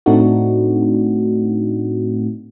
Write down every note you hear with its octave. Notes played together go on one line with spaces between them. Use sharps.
A2 A3 C4 D4 D#4 F#4